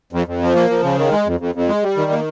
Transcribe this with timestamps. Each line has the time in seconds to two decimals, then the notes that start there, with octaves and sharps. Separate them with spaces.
0.13 F2
0.27 F2
0.42 F3
0.55 A#3
0.70 F3
0.83 C#3
0.99 D#3
1.12 G#3
1.27 F2
1.40 F2
1.55 F2
1.68 G#3
1.83 G3
1.97 D#3
2.12 A#3